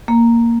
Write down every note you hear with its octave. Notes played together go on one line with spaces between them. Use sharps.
A#3